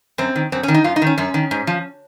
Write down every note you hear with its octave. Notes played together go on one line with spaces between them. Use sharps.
F#2 C4
D#3
F#2 C4
C#4
D#3
D#4
F#2 F4
D#4
D#3 C#4
F#2 C#4
D#3
G#2
F3